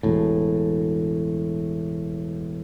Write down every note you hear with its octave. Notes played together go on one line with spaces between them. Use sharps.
E1 A2